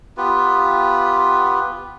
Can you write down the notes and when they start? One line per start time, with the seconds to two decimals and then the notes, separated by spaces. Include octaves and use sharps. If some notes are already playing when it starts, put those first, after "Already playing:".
0.17 B3 F4 G4 B4